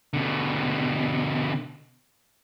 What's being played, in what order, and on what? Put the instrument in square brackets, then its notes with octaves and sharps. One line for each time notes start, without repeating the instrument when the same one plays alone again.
[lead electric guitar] B2 D3